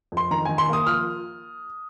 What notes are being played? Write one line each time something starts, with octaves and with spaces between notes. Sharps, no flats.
F2
C6
D#3 A#5
D#3 G#5
C6
A#3 D#6
F3 F6